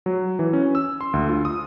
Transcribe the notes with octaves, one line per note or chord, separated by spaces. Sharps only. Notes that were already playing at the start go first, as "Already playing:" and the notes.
F#3
E3
C#4
E6
C6
D2
F4
D#6